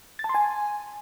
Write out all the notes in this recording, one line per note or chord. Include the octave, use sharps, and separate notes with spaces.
A6
A5
C6
G#5